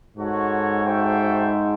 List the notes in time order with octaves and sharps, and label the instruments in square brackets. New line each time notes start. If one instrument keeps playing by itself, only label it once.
[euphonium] G#2 [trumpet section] F#4 A4 C#5
[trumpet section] F#4 A4 C5 E5 G5